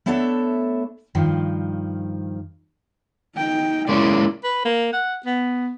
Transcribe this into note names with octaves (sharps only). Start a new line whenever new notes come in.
A3 B3 D4 A4 C#5 E5
G2 D#3 F3
D#4 G5
G#3 A#3 C#4 E4 D5
B4
A#3
F#5
B3